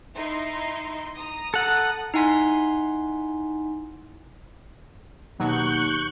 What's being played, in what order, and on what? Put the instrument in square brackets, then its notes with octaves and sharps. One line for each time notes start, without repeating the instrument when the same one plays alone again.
[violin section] D#4 E4 C6
A#5 D#6
[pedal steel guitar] A4 F#5
[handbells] D#4 E4 F#5 G#5 C6 B6
[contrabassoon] D#2 [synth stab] B2 F#3 [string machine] C#6 F#6 G6